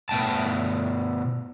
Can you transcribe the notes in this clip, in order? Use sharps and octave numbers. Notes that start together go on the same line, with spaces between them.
B2 A3 G5 A5